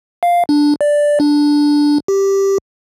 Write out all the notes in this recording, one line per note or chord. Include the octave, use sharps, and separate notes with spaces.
F5
D4
D5
D4
G4